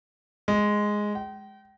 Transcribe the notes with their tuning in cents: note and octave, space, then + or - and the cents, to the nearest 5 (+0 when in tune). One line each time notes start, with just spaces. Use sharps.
G#3 +0
G5 -35